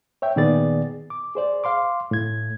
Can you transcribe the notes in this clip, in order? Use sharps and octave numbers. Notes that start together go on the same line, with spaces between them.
C#5 E5 G5
A#2 D#3 B3 G#4 D5 A6
D6
G#4 C5 D5
F5 C6 D6
A2 G#6